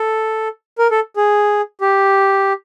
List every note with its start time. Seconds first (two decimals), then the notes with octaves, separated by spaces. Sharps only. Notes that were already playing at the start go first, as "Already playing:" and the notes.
Already playing: A4
0.78 A#4
0.91 A4
1.16 G#4
1.81 G4